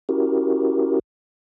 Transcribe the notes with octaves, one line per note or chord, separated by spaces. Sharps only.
C#4 E4 F#4 G4 A#4